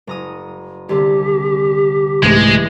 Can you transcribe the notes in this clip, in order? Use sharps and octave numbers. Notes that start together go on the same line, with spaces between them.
F#1 A#5 D#6
C2 D3 G4
C2 G#2 E3 G#3 A3